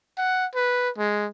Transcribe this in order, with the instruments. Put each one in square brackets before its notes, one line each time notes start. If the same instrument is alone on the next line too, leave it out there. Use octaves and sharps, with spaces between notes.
[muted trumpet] F#5
B4
G#3